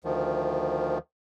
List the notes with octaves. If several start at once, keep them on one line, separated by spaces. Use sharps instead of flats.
D2 D#3 F3